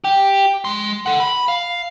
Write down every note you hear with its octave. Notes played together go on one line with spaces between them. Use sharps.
G4
G#3 C6
A4 F#5
B5
F5